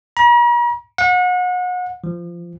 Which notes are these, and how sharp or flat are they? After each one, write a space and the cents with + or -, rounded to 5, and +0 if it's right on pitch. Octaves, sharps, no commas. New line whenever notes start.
A#5 +45
F#5 -35
F3 -20